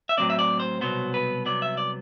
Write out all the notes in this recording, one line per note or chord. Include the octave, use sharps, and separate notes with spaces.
E5
A2 F#3 C4 D5
E5
D5
C5
C2 B2 F#3 B3 C5
B4
C2 C3 F#3 B3 D5
E5
D5